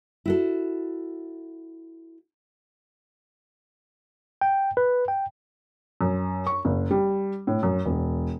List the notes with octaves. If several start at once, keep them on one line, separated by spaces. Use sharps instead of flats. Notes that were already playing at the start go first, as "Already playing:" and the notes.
E4 F#4 A4
G5
B4
G5
F#2
C#6
F#1
G3
A2
F#2
E1